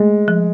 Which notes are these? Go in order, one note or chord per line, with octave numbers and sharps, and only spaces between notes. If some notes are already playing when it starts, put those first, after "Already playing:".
Already playing: G#3 A3
F3